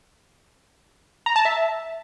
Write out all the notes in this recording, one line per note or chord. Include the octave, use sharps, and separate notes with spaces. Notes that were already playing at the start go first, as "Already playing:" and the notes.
A#5
A5
E5